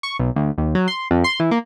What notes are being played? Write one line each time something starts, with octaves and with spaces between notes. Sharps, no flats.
C#6
B1
D2
D#2
F#3
C6
F2
C6
E3
A#3